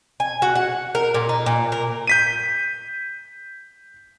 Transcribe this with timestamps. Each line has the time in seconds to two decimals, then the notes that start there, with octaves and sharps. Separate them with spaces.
0.20 G#5
0.42 F#4
0.55 F#5
0.95 A#4
1.14 A#2
1.29 D#4
1.46 A#2
1.72 A#4
2.07 G6 B6 D#7